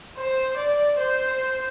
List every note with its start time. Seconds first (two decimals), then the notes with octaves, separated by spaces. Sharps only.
0.17 C5
0.57 D5
0.99 C5